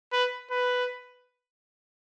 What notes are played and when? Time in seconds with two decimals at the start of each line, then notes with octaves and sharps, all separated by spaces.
0.13 B4
0.51 B4